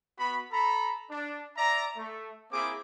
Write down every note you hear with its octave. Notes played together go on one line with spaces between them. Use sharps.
B3 F#4 B5
A4 A#5 B5
D4
D5 E5 A#5
A3
A#3 C4 E4 G#4 D6